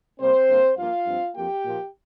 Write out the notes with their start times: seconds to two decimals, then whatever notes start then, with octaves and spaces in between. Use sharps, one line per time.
0.20 C3 G3 A#3 C4 C5
0.49 G2 D3 A#3
0.77 G2 F3 A#3 F4 F5
1.06 G2 F3 C4
1.35 F2 F3 A#3 G4 G5
1.65 A#2 F3 A#3